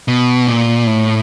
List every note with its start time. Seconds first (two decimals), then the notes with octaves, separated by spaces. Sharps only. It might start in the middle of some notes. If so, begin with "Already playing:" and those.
0.08 B2
0.47 A#2
0.87 A2